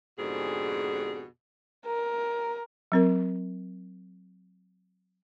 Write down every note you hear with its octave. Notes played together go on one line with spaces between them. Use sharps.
F2 G#2 B2 D3 G4 G#4
A#4
F#3 C4 A#4